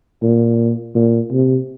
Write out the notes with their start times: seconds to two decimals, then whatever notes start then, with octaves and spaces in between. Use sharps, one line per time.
0.22 A#2
0.95 A#2
1.32 C3